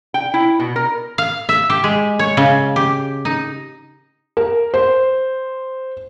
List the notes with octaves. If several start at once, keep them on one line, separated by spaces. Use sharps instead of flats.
G5
E4
B2
A#4
F5
E5
G4
G#3
C#5
C#3
G4
D#4
A#4
C5